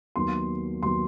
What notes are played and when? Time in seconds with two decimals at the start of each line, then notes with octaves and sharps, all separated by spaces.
0.16 D#2 D#3 F#3 B3 C6
0.83 D#2 D#3 F#3 B3 C6